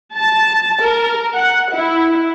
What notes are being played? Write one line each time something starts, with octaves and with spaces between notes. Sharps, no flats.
A5
A#4
F#5
E4